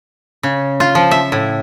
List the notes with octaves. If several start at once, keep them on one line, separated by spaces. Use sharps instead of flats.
C#3
F4
F3
E5
A2